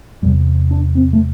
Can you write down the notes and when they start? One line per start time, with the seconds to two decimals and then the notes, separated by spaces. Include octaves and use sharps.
0.22 E2 G3
0.26 C3
0.71 D4
0.95 C4
1.13 A3